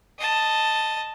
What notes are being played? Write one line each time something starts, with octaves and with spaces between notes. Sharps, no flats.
D#5 A5